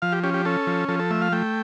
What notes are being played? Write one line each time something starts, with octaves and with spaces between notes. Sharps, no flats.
F3 F5
G4
C#4 G4
G4
C#4 A4
F3
F3 A4
A4
A3 E5
F5
A3 G5